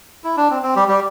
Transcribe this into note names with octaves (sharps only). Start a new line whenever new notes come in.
E4
D4
C4
C4
G3 G4
G3 G4